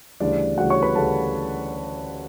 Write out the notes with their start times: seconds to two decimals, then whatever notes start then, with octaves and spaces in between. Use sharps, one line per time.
0.20 D2 C#3 E3 G3 D4 D5
0.58 D2 C#3 E3 G3 F#4 F#5
0.70 C#5 C#6
0.82 B4 B5
0.95 D2 C#3 E3 G3 A4 A5